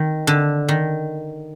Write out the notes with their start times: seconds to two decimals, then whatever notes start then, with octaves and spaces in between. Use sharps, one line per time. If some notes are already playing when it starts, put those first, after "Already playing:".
Already playing: D#3
0.27 D3
0.69 D#3